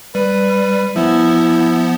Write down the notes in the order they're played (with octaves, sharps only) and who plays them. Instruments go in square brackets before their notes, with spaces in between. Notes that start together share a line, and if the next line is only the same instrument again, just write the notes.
[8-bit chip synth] G3 [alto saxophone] B4
[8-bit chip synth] F3 B3 [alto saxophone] E4